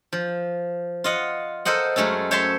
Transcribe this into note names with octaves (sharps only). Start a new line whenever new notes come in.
F3
F4 D#5 F#5
A4 A#4 C5 D#5 F#5
F#2 G#3 A3 C#4 A4
C5 C#5 E5 A5 C6